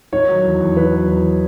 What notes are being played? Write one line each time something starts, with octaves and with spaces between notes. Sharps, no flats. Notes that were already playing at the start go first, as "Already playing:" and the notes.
D#3 C#5
F#3
E2
E2
D#3 B4
F#3
E2